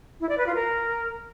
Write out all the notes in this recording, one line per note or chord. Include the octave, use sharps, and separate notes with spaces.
E4
D5
B4
F4
A#4